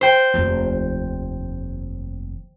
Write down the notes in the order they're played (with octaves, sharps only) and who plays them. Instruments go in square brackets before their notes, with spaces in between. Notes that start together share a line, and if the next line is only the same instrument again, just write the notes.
[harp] C5 G5
[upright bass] F1 D#2